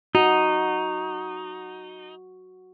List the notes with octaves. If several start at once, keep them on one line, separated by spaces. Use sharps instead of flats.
D#4 F#4